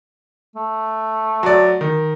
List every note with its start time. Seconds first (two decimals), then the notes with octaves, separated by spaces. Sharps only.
0.56 A3
1.43 F#3 D5
1.81 D#3